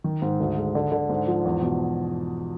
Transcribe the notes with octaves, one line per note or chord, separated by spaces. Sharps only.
D#3
G#2
D2
G#3
D3
D3
G#2
F3
E2
B2